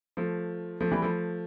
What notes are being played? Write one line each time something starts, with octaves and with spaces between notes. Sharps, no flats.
F3 A3
F3 A3
E3 G3
F3 A3